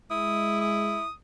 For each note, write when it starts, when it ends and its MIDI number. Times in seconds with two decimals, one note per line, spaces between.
0.11 0.98 56
0.11 1.05 64
0.11 0.57 87
0.61 1.11 87